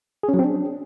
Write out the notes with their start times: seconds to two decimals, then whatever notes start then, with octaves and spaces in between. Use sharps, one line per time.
0.23 G#4
0.29 C#4
0.34 F#3
0.39 C4
0.44 D4